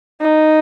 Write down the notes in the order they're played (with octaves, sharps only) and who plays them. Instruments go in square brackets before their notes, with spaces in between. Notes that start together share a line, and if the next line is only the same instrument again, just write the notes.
[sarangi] D#4